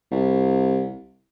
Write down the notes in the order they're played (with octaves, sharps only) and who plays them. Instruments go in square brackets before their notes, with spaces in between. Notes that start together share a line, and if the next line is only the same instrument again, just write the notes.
[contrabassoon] C2